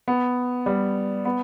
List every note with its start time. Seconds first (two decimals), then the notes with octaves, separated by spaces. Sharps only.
0.08 B3
0.66 G3
1.25 B3